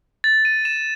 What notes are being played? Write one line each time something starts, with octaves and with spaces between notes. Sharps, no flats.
A6
D#7
E7